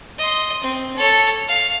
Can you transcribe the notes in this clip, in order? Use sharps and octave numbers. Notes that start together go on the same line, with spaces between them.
D#5 C6
C4
A4 C#5
F5